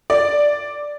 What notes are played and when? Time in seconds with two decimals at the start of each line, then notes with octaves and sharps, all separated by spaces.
0.10 D5